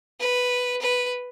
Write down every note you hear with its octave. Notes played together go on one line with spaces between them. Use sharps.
B4
B4